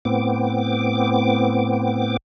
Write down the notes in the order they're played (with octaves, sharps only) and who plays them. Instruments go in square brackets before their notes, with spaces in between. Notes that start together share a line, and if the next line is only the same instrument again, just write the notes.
[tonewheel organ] A2 B3 C4 D6